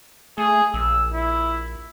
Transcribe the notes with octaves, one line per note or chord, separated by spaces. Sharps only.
A3 G#4
A#1 E6
E4